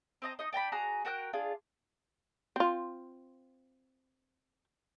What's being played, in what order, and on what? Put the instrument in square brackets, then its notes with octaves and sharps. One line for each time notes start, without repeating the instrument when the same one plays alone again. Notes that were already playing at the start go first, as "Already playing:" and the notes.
[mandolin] C4 D#5 A#5
D#4 D#5
D4 G5 A#5 B5
F#4 G#4 A#5 F#6
F#4 A#4 G5 F#6
D4 F4 G#4
[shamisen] C4 F4